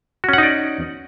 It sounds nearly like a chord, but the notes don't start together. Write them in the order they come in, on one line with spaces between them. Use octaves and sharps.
F#4 C#4 F#5 D#4 D5